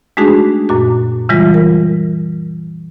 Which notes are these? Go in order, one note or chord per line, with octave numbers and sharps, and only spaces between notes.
G#3 A3 D4 D#4 F#4 G#4
F#2 A#2 F#4
C#3 E3 G3 G#3 F4
A#4